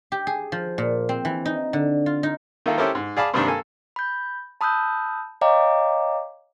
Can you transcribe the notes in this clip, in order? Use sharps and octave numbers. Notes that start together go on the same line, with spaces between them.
G4
G#4
F3
A#2
C4
E3
D#4
D3
F4
D#4
D#3 A#3 E4 F4 A4
C#4 E4 G4 A4 A#4 C5
G#2
G#4 D5 F5 A5 B5 D6
G2 C3 D#3 G3 A#3 D4
A#3 A4 G#5
B5 G6
A5 B5 D#6 E6 F#6 G6
C#5 D#5 F5 G5 A#5 D6